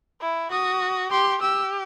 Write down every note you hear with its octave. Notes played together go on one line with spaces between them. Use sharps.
E4
F#4 D#6
G4 C6
G4 E6